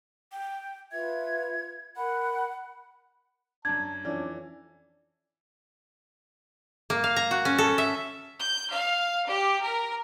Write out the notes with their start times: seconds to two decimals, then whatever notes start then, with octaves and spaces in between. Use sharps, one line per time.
0.32 G5
0.92 F4 B4 E5 G#6
1.96 A#4 F#5 B5 F#6
3.65 F#2 D4 A5 G#6
4.05 F2 E3 C#4 D4 D5
6.90 A#3
7.04 F5
7.16 A#5
7.31 F#4
7.45 C#4
7.58 A4
7.78 E5
8.40 G6
8.72 F5
9.29 G4
9.62 A#4